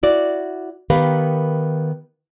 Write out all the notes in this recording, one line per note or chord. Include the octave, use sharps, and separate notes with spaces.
E4 F#4 D5
D#3 B3 G4 A#4 B4 F5